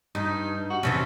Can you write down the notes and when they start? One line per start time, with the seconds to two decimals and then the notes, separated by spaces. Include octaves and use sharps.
0.15 G2 D#4
0.70 F#4
0.83 F2 C3 E3 C#4